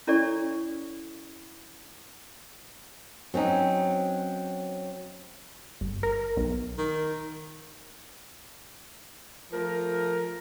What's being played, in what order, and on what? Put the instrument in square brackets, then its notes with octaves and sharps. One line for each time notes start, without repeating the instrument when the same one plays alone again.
[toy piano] C#4 E4 A4 C#5 D5 C#6
[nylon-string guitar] F#3 C4 C#4 D#4
[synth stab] G1
A#4
B1
[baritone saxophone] D#3
[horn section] F3 A3 A#4